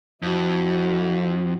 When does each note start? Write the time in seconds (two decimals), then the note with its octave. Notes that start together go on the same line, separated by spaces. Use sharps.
0.23 F2 E4 F#4